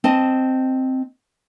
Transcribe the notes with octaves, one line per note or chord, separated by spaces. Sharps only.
C4 D#5 A5